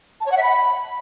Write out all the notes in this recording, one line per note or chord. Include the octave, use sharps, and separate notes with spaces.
A5
C#5
F#5
E5
B5